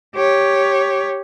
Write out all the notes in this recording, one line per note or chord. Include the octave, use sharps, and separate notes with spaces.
G4 C#5